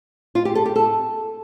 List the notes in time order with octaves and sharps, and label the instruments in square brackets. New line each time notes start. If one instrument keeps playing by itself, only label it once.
[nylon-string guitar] F4
G4
A4
G4
A4